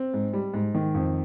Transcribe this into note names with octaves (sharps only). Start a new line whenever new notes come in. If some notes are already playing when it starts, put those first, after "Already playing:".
Already playing: C4
G#2
G3
G#2
D#3
F2